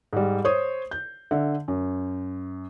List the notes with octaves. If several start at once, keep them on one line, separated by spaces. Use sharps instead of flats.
G#2 G3
C5 C#5 C#6 D#6
G6
D3 E5
F#2